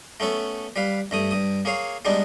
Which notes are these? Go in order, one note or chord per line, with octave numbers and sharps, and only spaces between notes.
A3 B3 C#4 A4
G3 B4 F5
G2 A3 D#6
G2 D#6
A#3 G#4 C#5 F5
G3 G#3 B3 D4 D#4